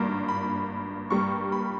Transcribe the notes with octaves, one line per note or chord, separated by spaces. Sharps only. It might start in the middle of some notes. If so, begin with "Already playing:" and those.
Already playing: G#1 G2 A#3
B5
G2 G3 A#3 C#6
B5